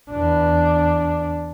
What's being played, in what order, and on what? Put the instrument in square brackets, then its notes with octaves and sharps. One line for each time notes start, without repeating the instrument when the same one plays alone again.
[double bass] E2 D4